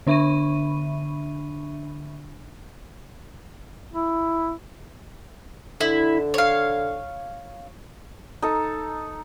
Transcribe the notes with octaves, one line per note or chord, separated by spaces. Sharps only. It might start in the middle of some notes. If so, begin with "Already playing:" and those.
D3 D4 E5 B5 C#6 D#7
E4
D3 E4
C#5 F5
D#4 A4